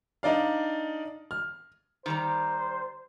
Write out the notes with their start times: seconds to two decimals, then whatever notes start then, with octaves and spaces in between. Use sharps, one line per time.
0.23 D4 D#4 D5 F5
1.31 F6
2.06 D#3 G3 C5 A#5